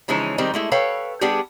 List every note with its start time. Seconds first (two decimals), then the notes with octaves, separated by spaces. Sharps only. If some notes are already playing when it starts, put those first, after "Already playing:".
0.08 C#3 E3 F3 G#3 C#4 D#4
0.38 D#3 G3 G#3 C4 D#4
0.54 G#3 A3 E4
0.72 A4 B4 C#5 F5 G5
1.21 G3 B3 D4 G4 G#4